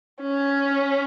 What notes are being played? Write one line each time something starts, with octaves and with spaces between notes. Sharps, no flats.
C#4